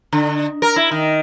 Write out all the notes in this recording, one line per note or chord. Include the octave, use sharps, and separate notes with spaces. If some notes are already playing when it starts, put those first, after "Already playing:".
D3
A#4
E4
D#3